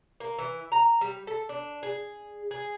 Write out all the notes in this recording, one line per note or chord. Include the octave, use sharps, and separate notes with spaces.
A#3
E3
A#5
G3
A4
D4
G#4
G#4